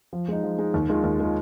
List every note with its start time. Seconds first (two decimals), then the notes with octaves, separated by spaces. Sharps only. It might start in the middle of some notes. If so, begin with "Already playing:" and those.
0.13 F3
0.28 G#3 D#4
0.43 F3
0.59 G#3 D#4
0.74 D#2
0.89 D#3 G#3 F4
1.04 D#2
1.19 D#3 G#3 F4